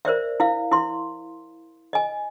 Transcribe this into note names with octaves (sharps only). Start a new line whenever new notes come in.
A#4 C5 D5 E5
E4 F5
E4 C6
D#5 G#5